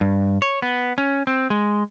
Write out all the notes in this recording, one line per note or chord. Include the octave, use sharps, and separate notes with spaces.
G2
C#5
B3
C#4
C4
G#3